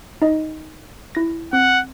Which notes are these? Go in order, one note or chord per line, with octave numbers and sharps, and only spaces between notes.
D#4 D#5
E4 A#6
C4 F#5